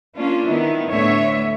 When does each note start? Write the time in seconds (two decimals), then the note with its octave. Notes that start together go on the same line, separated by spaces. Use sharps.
0.16 A#3 C#4 D4 F4
0.46 D#3 B3 E4
0.87 D2 A2 D3 B3 C#5 E5